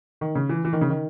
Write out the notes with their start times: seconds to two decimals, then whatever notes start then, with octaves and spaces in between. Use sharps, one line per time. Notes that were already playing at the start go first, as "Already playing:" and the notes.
0.21 D#3
0.35 C#3
0.49 E3
0.65 E3
0.73 D#3
0.81 C#3
0.90 D#3